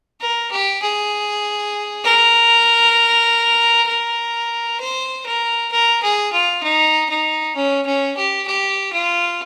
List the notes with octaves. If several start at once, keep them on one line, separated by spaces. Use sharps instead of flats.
A#4
G4
G#4
A#4
A#4
C5
A#4
A#4
G#4
F4
D#4
D#4
C#4
C#4
G4
G4
F4